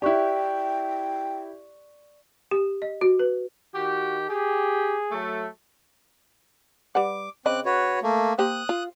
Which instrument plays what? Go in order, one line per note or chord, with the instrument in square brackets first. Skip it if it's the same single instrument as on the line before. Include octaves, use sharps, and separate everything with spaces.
[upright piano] E4 G4 [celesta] D5 C#6 F#6 [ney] G5
[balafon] G4
D#5
F#4
B4
[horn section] D#3 G4 [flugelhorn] F#4
[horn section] G4 [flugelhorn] G#4
[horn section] F#3 A3
[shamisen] G3 B4 F#5 [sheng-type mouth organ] D6
[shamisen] C#3 D#5 B5 [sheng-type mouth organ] C4 D6 F#6
[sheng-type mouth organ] F#4 B4 C#5
A3 A#3
[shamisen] A#3 G4 C5 [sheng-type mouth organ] D#6 F#6
[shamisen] F4